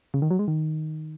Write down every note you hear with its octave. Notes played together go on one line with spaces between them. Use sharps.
C#3
D#3
F#3
G#3
D#3